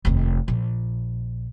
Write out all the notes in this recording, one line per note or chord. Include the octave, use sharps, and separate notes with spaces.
F1 D#2
A#1